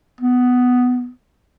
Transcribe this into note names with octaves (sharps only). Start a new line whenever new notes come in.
B3